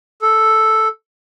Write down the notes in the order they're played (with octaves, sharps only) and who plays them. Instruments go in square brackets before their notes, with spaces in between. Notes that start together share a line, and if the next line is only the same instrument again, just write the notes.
[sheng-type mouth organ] A4